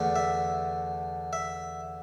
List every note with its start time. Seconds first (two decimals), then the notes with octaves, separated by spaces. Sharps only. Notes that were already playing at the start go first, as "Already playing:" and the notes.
Already playing: E2 D3 A3
0.16 E5
1.33 E5